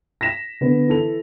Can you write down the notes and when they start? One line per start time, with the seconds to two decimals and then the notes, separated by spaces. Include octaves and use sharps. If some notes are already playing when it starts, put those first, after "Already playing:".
0.21 A#6 B6 E7
0.61 D3 B3
0.88 E3 A4 F7